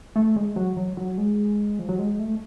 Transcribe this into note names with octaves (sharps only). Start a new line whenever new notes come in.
A3
G#3
F#3
F#3
F#3
G#3
F3
F#3
G#3
A3